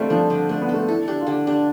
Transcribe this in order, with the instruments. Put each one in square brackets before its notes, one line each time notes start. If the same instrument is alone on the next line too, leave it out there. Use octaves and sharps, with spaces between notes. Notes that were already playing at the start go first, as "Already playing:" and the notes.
Already playing: [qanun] G3 A4 [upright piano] A3 C4 F4
[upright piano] F3 [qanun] D4
[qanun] D3
[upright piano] A3 [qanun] D4
[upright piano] B3
[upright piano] A3 [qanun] A4
[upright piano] E4 [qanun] A4
[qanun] D4 [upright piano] G4
[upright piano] F4
[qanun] D3 [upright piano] G4
[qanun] D4 [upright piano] G4